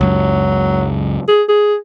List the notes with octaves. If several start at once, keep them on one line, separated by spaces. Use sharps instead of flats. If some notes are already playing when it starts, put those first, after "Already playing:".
C#2 F#2 F#3
G#4
G#4